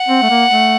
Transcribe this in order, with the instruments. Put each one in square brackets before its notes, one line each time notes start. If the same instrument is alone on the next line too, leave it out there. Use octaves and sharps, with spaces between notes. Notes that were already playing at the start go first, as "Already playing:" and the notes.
Already playing: [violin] F#5
[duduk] C4
A3
A#3
A3